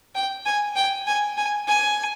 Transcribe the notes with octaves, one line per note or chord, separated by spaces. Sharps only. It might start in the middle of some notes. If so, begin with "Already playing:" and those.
G5
G#5
G5
G#5
G#5
G#5